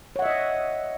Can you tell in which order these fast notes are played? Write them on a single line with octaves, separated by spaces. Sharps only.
C#5 F#5 E5 D#5